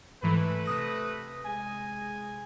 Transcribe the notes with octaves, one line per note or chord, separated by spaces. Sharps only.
G#2 E3 A3 B4
C3 D#6 A#6
G#3 G#5